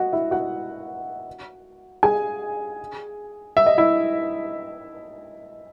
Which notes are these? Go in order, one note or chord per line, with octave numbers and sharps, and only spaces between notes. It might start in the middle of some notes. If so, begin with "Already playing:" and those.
Already playing: F#4 D#5 F#5
E4 E5
F#4 F#5
G#4 G#5
E5
D#5
E4 E5